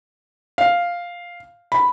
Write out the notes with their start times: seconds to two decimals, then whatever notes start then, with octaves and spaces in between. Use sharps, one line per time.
0.58 F5
1.72 B5